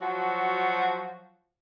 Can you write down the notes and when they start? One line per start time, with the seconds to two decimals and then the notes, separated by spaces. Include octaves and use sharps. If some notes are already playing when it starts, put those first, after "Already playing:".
0.01 F3 F#3 F#4